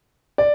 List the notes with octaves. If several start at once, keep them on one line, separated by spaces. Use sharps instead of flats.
D5